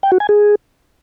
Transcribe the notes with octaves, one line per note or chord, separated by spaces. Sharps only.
G5
F#4
G#5
G#4